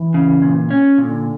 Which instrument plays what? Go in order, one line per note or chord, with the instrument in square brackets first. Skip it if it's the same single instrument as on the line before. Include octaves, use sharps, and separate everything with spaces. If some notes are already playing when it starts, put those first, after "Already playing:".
Already playing: [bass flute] E3
[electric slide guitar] C#3
A#2
C#4
[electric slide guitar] A#2 [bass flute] D3